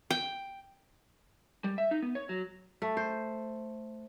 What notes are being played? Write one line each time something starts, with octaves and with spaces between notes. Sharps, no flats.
G5
G3
E5
D#4
B3
C#5
F#3
A3
C5